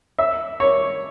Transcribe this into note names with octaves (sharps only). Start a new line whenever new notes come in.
E5
C#5